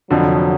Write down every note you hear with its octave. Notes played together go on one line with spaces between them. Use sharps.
F1 F2 D3 F3 F#3